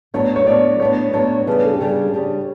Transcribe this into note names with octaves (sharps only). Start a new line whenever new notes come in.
A2 F#3 B3 D4 C#5
C#5
A2 F#3 B3 D4 D5
A2 F#3 B3 D4 C#5
A2 F#3 B3 D4 C#5
C#3 G3 D4 B4
A4
G4
C#3 G3 D4 A4
C#3 G3 D4